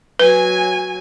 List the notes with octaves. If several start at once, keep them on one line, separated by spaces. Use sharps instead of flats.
F#3 B4 G#5